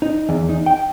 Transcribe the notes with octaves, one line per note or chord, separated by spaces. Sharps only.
D#4
E2
D#4
G5